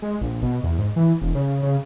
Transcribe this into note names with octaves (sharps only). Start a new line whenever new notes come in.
G#3
A#1
B2
E2
G#2
E3
E1
C#3
C#3